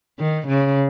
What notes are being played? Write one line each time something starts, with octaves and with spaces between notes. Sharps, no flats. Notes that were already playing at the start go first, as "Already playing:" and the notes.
D#3
C#3